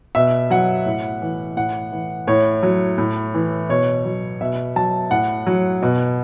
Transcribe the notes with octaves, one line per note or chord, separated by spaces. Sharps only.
B2 E5
F#3 F#5
A2
E3
A2 F#5
E3
A2 C#5
F#3
A2
E3
B2 C#5
F#3
B2 E5
F#3 A5
A2 F#5
F#3
B2